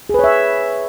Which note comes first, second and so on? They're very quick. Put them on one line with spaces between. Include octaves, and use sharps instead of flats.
G#4 B4 C#5 E5